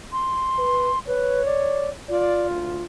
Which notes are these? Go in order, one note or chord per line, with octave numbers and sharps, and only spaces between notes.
C6
B4
B4 C#5
D5
F4 D5
D2